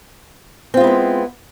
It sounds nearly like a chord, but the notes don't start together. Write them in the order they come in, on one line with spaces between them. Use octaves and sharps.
C4 F4 G#3 E4 B3